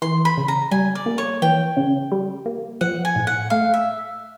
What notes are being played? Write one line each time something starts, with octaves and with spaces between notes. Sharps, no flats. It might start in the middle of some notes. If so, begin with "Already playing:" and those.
E3 C6
B5
C#3
A#5
G3 G#5
D5
A#3
C#5
E3 G5
C#3
G3
A#3
F3 F#5
G#5
A2
F#5
A3 F5
E5